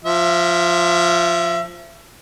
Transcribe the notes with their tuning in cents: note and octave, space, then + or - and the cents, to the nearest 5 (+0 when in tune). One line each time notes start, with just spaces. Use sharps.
F3 +0 E5 +25